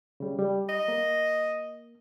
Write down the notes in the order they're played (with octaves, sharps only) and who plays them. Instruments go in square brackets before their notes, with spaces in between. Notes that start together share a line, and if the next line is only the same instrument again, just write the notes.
[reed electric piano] C#3 G3
G3
[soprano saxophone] D#5
[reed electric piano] A#3